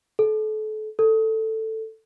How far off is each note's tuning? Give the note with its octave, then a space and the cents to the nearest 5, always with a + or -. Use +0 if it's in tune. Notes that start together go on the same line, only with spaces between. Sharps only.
A4 -35
A4 +10